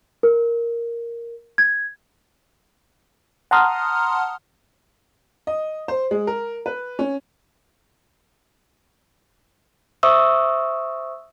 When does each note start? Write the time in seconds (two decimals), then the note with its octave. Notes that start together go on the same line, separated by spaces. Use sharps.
0.23 A#4
1.58 G#6
3.51 F#5 A5 A#5 C6 D#6 F6
5.47 D#5
5.88 C5
6.11 G#3
6.27 A#4
6.66 B4
6.99 C#4
10.03 C5 E5 C#6 D#6 E6